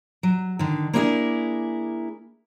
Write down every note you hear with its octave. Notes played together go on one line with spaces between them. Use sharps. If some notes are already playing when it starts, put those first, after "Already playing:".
F#3
D3 D#3
A#3 D4 E4 G4 G#4 A#4